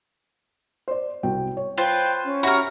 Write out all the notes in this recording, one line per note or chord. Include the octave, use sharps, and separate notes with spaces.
C5 D5
C2 F#4 G5
C#5
F4 B4 C5 G5
C#4
F#4 G4 A#4 E5 B5